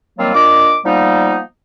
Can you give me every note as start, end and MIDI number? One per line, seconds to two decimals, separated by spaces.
0.19 0.31 51
0.19 0.31 54
0.19 0.31 55
0.19 0.31 58
0.19 0.31 60
0.19 0.31 65
0.34 0.75 46
0.34 0.75 62
0.34 0.75 75
0.34 0.75 86
0.85 1.39 53
0.85 1.39 55
0.85 1.39 58
0.85 1.39 59
0.85 1.39 63